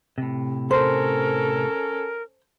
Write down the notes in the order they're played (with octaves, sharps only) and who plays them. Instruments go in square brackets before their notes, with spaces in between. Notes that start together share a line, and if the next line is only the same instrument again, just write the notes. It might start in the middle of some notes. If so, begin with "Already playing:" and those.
[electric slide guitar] A2 C3
[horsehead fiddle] C#4 A4 [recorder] A#4 [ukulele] C5